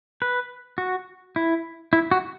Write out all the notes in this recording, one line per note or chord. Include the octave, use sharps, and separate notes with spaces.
B4
F#4
E4
E4
F#4